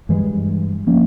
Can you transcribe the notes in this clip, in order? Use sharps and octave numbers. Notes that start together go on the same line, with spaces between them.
G2 E3 G#3
F3 A#3 C#4